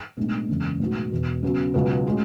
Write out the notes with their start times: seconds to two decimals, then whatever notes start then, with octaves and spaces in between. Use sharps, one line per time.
0.17 B1 A2 G#3 B3 D4
0.49 F#1 E2 C#3 G#3
0.79 B1 A2 G#3 B3 F#4
1.11 E1 E2 B2
1.43 C#3 F#3 B3 F#4
1.74 C#2 B2 F#3 B3 F#4
2.06 A2 G#3 C#4 F#4